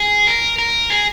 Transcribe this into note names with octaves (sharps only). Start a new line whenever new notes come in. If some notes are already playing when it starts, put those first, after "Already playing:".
Already playing: G#4
A#4
A#4
G#4